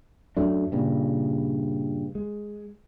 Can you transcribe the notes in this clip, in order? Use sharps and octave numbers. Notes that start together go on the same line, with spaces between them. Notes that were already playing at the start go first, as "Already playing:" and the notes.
F#2 F#3 A3 D4
G2 A#2 C#3
G#3